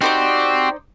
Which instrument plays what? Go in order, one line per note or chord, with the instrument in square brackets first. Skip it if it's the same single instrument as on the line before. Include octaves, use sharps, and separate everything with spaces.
[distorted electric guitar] C4 [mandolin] D#4 C5 D5 [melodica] F#4 G4 C6